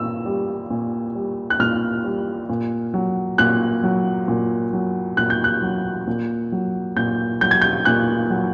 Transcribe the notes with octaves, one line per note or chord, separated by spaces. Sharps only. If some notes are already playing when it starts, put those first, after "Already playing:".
Already playing: A#2 E6
G3
A#2
G3
F#6
A#2 F6
G3
A#2
F#3
A#2 F#6
F#3
A#2
F#3
A#2 F#6
G6
F#6
F#3
A#2
F#3
A#2 G6
F#3 G6
G#6
G6
A#2 F#6
F#3